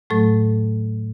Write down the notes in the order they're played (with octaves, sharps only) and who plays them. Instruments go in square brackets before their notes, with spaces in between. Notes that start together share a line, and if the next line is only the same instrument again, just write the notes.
[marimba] A2 F#3 A3 A4